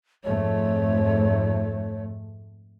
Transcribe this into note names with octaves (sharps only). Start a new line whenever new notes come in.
F2 G#2 A3 C#5